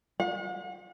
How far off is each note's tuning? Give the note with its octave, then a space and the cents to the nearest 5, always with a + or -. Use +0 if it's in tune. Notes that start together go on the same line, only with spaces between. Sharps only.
F#5 -45